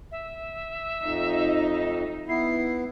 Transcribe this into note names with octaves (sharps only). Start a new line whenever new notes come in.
E5
F2 D#4
B3 E4 C7